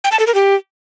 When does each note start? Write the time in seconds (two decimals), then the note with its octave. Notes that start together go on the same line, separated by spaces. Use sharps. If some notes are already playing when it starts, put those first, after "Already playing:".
0.04 G5
0.12 A5
0.19 A4
0.27 A#4
0.35 G4